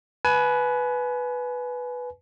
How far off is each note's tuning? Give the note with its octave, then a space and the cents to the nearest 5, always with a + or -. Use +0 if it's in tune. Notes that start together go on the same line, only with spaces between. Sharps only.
B4 +0 G#5 +30